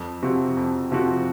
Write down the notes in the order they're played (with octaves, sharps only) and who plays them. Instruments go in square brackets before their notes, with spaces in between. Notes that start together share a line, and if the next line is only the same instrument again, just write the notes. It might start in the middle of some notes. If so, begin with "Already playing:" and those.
Already playing: [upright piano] F2
C3 F3 C4 F#4
F2
C3 F3 C4 F#4